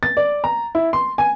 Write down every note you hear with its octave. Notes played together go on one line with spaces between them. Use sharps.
A6
D5
A#5
E4
C6
G#5